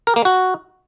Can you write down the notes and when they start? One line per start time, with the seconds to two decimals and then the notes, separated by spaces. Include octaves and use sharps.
0.07 A#4
0.16 A#3
0.25 F#4